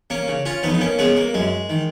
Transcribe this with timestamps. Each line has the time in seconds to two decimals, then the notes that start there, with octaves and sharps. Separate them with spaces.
0.10 A#3 C#4
0.28 C#3
0.45 C#4 F4
0.63 F2 B3 D#4
0.74 D#4
0.81 A#3 C#4
0.99 C#3 G#3 B3
1.17 A#3
1.34 F#2 G#3
1.69 D#3